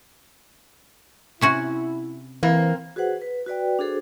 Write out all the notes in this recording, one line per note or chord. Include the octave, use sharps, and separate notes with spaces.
C3 C#4 E4 F#4
E3 A#3 C4
F#4 G#4 B4 C5 F#5
B4
F#4 B4 D5 G5
D4 F#4 G#4 A4 C5